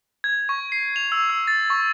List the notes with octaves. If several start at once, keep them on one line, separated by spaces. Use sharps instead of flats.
G#6
C#6
C7
F7
E6
E6
A6
C#6